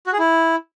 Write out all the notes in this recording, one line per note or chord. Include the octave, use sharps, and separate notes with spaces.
F#4
G#4
E4